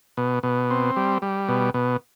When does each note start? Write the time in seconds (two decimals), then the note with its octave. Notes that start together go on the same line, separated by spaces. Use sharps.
0.17 B2
0.43 B2
0.71 C4
0.96 G3
1.22 G3
1.49 B2
1.74 B2